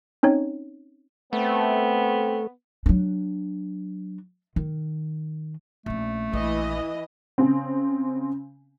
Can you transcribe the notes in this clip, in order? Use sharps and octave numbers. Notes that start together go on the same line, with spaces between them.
C4 C#4 D#4 C#5
A3 B3 C4
F#3 D4
D#3
A#1 A3 C#4
A#1 E3 D#5
C#3 C4